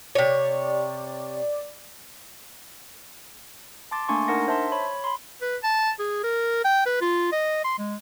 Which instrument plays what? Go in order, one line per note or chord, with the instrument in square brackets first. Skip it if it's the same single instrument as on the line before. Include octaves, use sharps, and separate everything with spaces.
[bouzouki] C3 C#5 [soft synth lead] D5
[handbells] A5 C6 D6 A6
A3 A#3 D4 G#5 C6 C#6
D4 D#4 A#4 F#5 A#6
C5 E5 A5 C6
C#5 B5
B5 C6
[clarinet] B4
A5
G#4
A#4
G5
B4
F4
D#5
C6
G#3